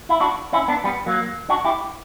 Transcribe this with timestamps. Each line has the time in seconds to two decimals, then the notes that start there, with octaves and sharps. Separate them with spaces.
0.09 E4
0.20 D4 F#4
0.53 C#4 E4
0.68 B3 D4
0.84 G3 B3
1.06 F#3 A#3
1.49 D4 F#4
1.65 E4 G4